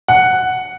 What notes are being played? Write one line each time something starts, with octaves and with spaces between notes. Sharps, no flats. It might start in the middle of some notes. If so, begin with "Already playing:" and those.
F#5